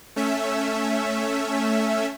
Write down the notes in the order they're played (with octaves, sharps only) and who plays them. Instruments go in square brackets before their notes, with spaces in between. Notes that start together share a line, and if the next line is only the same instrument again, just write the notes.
[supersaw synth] A3 C#4 E5